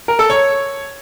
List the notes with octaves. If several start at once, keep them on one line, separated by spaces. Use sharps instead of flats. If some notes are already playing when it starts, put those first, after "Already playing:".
A#4
A4
C#5